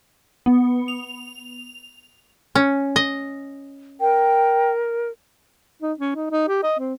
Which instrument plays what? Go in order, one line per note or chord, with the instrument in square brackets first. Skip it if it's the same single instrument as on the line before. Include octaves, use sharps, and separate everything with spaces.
[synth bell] B3
F7
[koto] C#4
D#5
[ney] A#4 [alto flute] G5
[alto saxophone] D#4
C#4
D#4
D#4
G4
D#5
C4